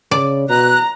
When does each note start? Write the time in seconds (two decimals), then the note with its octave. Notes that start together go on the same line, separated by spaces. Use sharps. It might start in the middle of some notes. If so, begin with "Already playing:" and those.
0.11 C#3 D5
0.49 B2 A#5 F#6